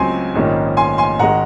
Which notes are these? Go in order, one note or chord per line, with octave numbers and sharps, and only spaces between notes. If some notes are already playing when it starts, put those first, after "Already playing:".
Already playing: C#2 C#3 F#3 C4 G#5 C6
A#1 G#2 D#3 A#3 C#4
G#5 C6
G#5 C6
G#1 D#3 G#3 F#5 A#5